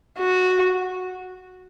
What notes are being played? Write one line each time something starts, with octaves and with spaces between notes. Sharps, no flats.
F#4